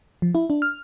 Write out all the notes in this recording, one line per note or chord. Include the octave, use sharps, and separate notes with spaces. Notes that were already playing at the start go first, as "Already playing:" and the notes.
F3
E4
D4
F6